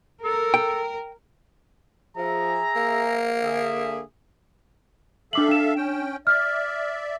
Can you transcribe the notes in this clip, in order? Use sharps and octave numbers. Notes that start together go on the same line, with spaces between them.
A4 A#4
G5
F3 G#4 E5 A#5
A#3
D3 G#4 E5
D4 A4 E5 F5 D6 F#7
D4 E7
C#4 G5
D5 E5 F6